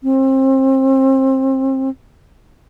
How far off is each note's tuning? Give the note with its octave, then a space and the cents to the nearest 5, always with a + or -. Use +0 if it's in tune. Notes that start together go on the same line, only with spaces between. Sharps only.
C4 +30